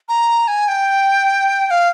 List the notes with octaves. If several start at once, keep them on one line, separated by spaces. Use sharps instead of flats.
A#5
G#5
G5
G5
F5